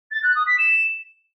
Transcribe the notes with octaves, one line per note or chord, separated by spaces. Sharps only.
A6
F#6
D#6
B6
E7